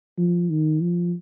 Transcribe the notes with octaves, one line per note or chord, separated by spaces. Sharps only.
F3
D#3
F3